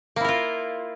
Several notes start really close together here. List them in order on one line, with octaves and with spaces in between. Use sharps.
A#3 E4 A#4 F4